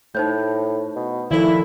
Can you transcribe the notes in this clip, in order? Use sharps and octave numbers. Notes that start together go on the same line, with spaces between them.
A2 A3 D#4 C5 G6
B2
A#2 D#3 F3 E4 A4